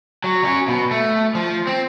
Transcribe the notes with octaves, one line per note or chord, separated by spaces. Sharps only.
F#3
F#3 C#4
B2
A3
F3
C4